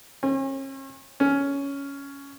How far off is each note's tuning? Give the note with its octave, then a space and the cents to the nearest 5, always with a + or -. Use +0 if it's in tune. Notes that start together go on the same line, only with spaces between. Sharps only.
C#4 -40
C#4 +10